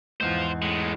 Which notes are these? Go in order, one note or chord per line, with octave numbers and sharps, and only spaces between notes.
E2 G#2 F4 C5
A2 G#3